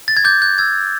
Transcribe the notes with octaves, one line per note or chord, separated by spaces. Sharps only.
A6
G#6
D6 G6
F#6 G6
E6 G#6
E6